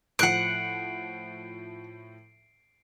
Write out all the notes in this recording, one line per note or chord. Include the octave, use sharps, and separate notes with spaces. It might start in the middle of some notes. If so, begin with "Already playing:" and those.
A2 F3 F#5 F#6 C7 D7